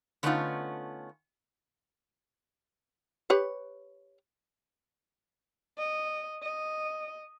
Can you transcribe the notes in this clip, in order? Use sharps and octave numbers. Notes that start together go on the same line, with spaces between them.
D3 A3 B3 C#4 D#4 F4
G4 B4 C#5
D#5
D#5